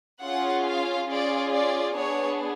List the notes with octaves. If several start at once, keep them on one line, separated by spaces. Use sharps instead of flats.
C#4 F4 G#4 F#5
F5
C#4 F4 G#4 D5
D5
B3 D4 G#4 C#5